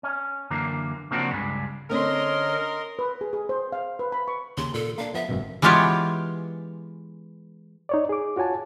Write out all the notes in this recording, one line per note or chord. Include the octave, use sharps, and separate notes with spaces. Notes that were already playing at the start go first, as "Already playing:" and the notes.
C#4
F#2 D3 E3 A#3
C#3 F3 A#3 C4 D4 F#4
C#2 G2 G3 G#3
D3 C4 C#4 A#4 D#5 C6
B4
G#4
G#4
C5
F5
B4
B5
C#6
D#2 C#3 C6
A#2 A4
A#3 D4 F5
F3 B3 E5
G#1 F#2 B2
E3 G#3 B3 F4 G4 C#5
D#4 C#5 D5
G#4 D6
F4 F#4 C#5 G#5 A5